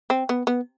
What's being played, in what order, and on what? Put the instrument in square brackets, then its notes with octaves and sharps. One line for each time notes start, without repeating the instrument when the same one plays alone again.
[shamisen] C4
B3
B3